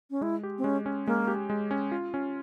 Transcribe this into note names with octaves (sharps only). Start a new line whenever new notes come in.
C#4
G#3 E4
G4
C4
G#3 C#4
C#4
G#3 A#3
G4
G#3
C#4
F4
C#4